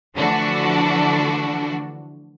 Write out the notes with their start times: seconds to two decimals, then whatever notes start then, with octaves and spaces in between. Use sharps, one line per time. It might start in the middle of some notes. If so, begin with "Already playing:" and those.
0.17 D3 E3 F3 A3 D4 F#4